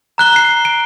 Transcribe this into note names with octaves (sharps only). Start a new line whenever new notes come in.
A#5 F#6 G7
C7
D7